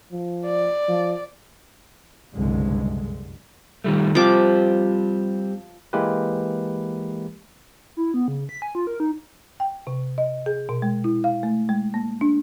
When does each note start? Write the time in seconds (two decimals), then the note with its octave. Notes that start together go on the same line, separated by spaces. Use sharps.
0.12 F3
0.45 D5
0.88 F3
2.34 F#1 C2 G2 D3 G#3
3.84 D#3 G3 A3
4.15 F3 G3 C4 G4 D6
5.93 E3 G#3 A#3 G4 A#4 B4
7.97 E4
8.14 B3
8.28 C#3
8.49 B6
8.62 G#5
8.75 F4
8.87 A#4
9.00 D#4
9.60 G5
9.87 C3
10.18 D#5
10.46 G#4
10.69 B2
10.82 G#3
11.04 E4
11.24 F5
11.43 A3
11.69 G#3
11.94 A#3
12.21 D4